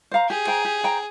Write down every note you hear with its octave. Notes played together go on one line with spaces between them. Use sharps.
C5 F5 A#5
G4 G#4
C5 G5 A#5
G4
C5 G5 A#5